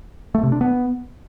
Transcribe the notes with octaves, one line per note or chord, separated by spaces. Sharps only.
A3
C3
D4
B3